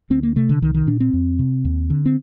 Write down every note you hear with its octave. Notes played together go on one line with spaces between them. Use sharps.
D2 C4
A#3
C3 A3
D3
C2 D#3
D#3
A#2 D4
C4
F2
C3
D#2
D3
C4